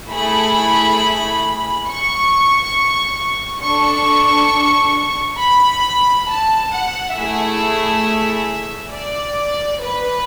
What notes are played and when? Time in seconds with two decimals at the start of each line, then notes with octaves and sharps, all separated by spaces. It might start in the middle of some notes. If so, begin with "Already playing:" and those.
0.11 A3 E4 G#4 B5
1.88 C#6
3.64 D4 A4 C#6
5.40 B5
6.29 A5
6.73 F#5
7.17 A3 E4 G#4 E5
8.93 D5
9.82 B4